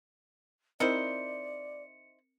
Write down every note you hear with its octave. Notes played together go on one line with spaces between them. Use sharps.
C4 D#4 E4 A#4 C5 D5 D#5 C#7